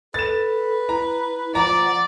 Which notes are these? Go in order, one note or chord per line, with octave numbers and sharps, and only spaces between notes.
A4 B4 A6 E7
E4 A#5
F3 D5 F#5 A#5